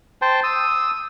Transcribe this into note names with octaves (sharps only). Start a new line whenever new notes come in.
C5 G5 A5
D#6 E6